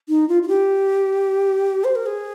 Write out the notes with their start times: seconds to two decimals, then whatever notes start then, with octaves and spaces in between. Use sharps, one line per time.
0.08 D#4
0.28 F4
0.42 F4
0.48 G4
1.84 C5
1.95 A#4
2.05 G#4